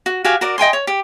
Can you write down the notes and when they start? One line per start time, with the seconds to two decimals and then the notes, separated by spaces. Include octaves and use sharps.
0.06 F#4
0.24 F#4 G4 F5 G#5
0.41 F#4 A#4 D5
0.58 D#5 G5 G#5 C6
0.73 C#5
0.87 G4